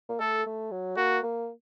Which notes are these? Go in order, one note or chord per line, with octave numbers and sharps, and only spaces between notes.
A#3
A3 A4
A3
F#3
A#3 F#4
A#3